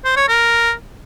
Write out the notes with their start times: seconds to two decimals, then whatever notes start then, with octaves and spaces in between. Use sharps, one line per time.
0.05 C5
0.17 C#5
0.28 A#4